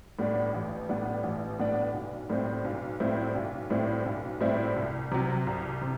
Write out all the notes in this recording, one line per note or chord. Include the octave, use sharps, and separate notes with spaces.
A2 G3 B3 D4
A1
A2 G3 B3 D4
A1
A2 G3 B3 D4
B1
A2 G3 C4 E4
B1
A2 G3 C4 E4
B1
A2 G3 C4 E4
B1
A2 G3 C4 E4
C2
C3 F#3
C2
C3